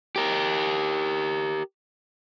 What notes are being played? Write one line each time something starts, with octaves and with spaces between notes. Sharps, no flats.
G4 A#4